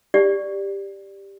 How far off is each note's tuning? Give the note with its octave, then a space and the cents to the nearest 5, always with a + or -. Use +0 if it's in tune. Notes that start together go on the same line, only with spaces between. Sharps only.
G4 +5 D5 +0